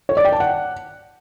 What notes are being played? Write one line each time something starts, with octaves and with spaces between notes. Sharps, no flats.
C#5
D5
G5
A5
F#5